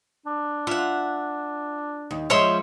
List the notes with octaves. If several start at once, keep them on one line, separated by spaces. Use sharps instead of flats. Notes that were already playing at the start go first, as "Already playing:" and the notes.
D4
F4 E5 F#5
D#2
F3 G#3 C#4 C#5 E5 C6